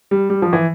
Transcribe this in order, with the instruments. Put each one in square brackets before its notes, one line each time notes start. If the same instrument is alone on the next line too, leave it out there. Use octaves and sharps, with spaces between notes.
[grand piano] G3
G3
F3
E3